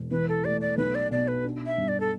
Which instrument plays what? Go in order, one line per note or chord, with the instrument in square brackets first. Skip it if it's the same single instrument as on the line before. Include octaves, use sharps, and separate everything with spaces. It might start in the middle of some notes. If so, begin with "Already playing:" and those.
Already playing: [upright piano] E1
[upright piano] E3 [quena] B4
[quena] A4
[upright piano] A3 [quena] D5
[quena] D5
[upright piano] B1 [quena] B4
[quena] D5
[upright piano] B2 [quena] D5
[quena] B4
[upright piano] D4
[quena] E5
[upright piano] G2
[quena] D5
A4